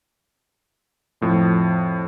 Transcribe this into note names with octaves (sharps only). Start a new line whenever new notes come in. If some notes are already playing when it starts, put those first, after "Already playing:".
F2 A2 F3